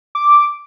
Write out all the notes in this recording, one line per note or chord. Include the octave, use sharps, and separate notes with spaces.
D6